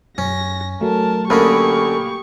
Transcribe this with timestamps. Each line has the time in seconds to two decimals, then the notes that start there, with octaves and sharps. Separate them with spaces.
0.18 F#2 C#4 A#6
0.81 F#3 A3 A#4 A5
1.30 F#2 D3 A#3 C#4 G4 B5 C#6 D#6